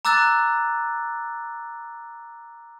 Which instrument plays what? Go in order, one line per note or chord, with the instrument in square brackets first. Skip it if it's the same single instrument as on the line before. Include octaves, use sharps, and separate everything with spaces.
[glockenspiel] A#5 D6 E6 F#6 A6